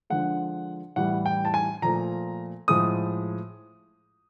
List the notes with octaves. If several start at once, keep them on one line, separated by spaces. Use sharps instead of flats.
D3 F3 G#3 F#5
A2 E3 G3 F#5
G5
A5
G#5
A#2 F3 A3 A#5
A2 F3 G#3 D#6